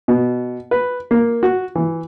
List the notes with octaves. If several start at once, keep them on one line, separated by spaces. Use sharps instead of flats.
B2
B4
A#3
F#4
E3